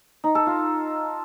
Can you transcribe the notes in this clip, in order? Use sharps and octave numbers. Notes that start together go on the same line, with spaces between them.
D#4
A4
F4